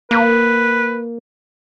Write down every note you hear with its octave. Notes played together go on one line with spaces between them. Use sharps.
A#3 B4